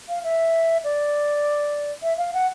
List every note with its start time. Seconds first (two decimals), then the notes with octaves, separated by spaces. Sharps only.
0.09 F5
0.24 E5
0.84 D5
2.03 E5
2.18 F5
2.34 F#5